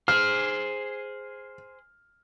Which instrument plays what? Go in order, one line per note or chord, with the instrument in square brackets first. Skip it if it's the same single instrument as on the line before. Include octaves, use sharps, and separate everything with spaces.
[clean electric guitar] G#4 C5 [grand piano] F6